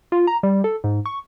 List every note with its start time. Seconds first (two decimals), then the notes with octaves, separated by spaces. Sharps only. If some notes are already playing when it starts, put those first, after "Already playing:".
0.12 F4
0.27 A#5
0.43 G3
0.64 A4
0.84 G#2
1.06 C#6